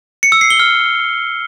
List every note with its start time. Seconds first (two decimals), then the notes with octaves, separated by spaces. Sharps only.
0.23 C#7
0.32 E6
0.41 C7
0.50 G7
0.60 F6